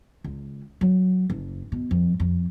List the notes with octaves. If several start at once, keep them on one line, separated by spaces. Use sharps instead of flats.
C#2
F#3
F#1
B2
F2
F2